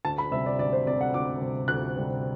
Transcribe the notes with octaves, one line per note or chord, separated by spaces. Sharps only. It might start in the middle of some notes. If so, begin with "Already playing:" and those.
D2 A5
B5
C3 G3 C4 E5
D5
D2 D5
C5
C3 G3 C4 D5
F#5
D2 D6
C3 G3 C4
D2 F#6
C3 G3 C4